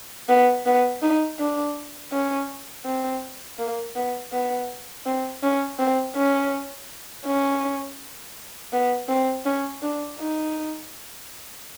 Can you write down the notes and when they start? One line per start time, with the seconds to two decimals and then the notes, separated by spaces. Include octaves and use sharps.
0.29 B3
0.66 B3
1.02 D#4
1.39 D4
2.12 C#4
2.86 C4
3.59 A#3
3.96 B3
4.32 B3
5.06 C4
5.43 C#4
5.79 C4
6.16 C#4
7.26 C#4
8.73 B3
9.09 C4
9.45 C#4
9.82 D4
10.19 D#4